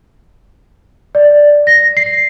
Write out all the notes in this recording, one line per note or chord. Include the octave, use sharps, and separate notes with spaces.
D5
A#6
C7